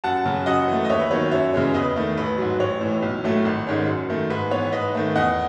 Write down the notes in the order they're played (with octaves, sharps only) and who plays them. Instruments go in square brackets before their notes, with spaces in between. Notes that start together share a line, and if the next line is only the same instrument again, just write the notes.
[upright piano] F#2 F#5 A5
C#3 F#3
F#2 D#5 F#5
E3 A3
D#5
D#2 C#5 E5
B4
D#3 F#3 B3 C#5
F#2 C#5 E5
C#3 E3 G#3 C#4
E2 B4 D#5
D#3 A3
A1 B4
G#2 F#3
A1 C#5
A2 E3
B1
A2 F#3 A3
G#1
G#2 D#3 G#3 C#4
F#2
D#3 A3
G#2 B4
E3 B3 C#5
G#2 B4 D#5
D#3 A3
E2 D#5 F#5